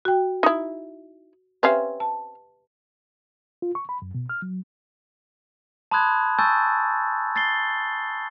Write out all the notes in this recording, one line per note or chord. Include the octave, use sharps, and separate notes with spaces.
F#4 G5
D#4 E4
C4 C#4 G4 B4 E5 F5
A5
F4
C#6
B5
F#2
B2
F6
F#3
A5 B5 C6 D#6 F#6 G#6
G#5 A5 C#6 E6 G6 A6
A6 C7 G7